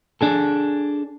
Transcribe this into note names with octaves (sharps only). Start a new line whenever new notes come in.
D4 G#4 A4